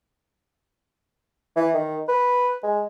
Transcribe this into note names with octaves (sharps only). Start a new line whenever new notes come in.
E3
D#3
B4
G#3